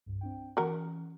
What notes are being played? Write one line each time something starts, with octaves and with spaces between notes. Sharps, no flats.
C2 G2
C4 D4 G5
E3 C#4 F#4 A#4